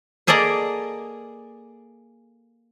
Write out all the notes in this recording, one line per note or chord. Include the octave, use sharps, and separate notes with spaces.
A#3 G#4 A4 D5 D#5 A#5